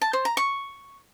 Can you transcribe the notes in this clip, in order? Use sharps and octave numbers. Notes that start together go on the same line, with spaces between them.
A5
C5
A#5
C#6